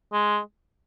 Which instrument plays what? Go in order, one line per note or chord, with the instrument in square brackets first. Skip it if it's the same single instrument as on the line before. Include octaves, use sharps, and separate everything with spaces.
[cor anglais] G#3